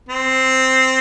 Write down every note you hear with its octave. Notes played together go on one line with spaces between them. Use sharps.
C4